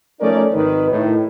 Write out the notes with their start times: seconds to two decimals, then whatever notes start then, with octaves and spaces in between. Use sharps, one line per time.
0.21 F3 A3 C#4 D#4 A#4 D5
0.53 G#1 D#3 D#4 B4
0.91 A2 D#3